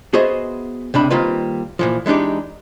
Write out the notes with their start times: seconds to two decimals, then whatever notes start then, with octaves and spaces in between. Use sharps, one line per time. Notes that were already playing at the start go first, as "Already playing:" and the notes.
0.14 B3 F#4 G#4 C5 D#5 E5
0.94 C#2 C3 D4 B5
1.10 D#3 G3 A#3 C4 F4 B4
1.79 A#2 E3 F3
2.06 E3 G#3 D4 D#4 G4